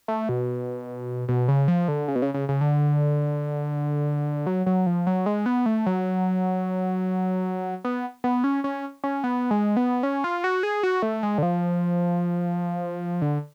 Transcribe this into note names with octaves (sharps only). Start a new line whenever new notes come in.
A3
B2
B2
C#3
F3
D3
C#3
B2
C#3
C#3
C#3
D3
F#3
F#3
F3
F#3
G#3
B3
A3
F#3
B3
B3
C#4
C#4
C#4
B3
G#3
B3
C#4
F4
F#4
G#4
F#4
A3
G#3
D3
F3
D3